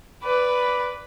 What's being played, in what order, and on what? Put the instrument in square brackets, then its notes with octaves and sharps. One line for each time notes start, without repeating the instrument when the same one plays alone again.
[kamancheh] B4 D5